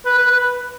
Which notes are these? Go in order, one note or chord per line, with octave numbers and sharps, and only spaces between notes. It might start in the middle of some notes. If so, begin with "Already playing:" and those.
B4
B4
B4